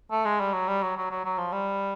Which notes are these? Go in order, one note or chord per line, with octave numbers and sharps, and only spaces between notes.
A3
G#3
G3
F#3
G3
F#3
F#3
F#3
F#3
F3
G3